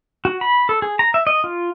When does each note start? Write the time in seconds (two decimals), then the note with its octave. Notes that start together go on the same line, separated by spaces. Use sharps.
0.25 F#4
0.41 B5
0.69 A4
0.82 G#4
0.99 A#5
1.14 E5
1.27 D#5
1.44 F4